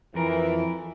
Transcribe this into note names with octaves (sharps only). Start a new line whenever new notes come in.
F2 E3 F3 A#4